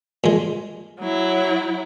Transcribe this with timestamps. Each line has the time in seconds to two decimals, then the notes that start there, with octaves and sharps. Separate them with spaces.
0.24 A#2 G#3
1.00 F#3 E4